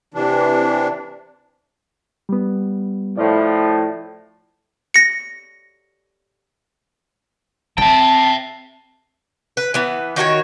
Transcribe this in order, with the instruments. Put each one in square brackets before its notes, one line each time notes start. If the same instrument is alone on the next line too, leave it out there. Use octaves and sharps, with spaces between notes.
[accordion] C3 E3 D4
[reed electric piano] G3 B3
[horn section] A2 F3 [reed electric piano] D5
[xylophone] A#6 C#7
[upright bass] C4 [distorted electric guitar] E5 G5 [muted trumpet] A5
[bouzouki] B4
E3 B3
D#3 F#4 A#4 C#5